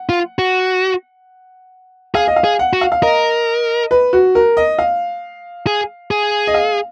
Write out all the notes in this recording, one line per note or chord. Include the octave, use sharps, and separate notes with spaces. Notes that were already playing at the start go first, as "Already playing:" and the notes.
Already playing: F#5
F4
F#4
G#4 F5
D#5
F5
G#4
F#5
F#4
F5
F5
A#4 D#5
B4
F#4
A#4
D#5
F5
G#4
G#4
D#5
F5